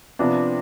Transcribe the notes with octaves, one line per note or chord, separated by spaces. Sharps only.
C3 F3 B3 D4